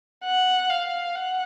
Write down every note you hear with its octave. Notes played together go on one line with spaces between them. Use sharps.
F#5
F5
F#5